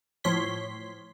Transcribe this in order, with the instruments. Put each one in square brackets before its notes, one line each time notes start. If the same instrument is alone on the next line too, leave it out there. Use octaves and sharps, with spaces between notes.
[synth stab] A2 F3 C#5 C6 B6